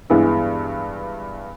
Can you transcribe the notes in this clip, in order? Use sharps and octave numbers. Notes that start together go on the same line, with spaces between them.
G2 E3 G#3 B3 E4